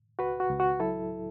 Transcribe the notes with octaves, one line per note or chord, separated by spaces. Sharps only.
C#2 F#4 B4
F#4
C#2
F#4
F#3 E4 A4